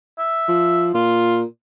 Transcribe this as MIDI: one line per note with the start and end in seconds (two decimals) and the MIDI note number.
0.19 0.88 76
0.48 0.90 53
0.94 1.44 46
0.94 1.41 65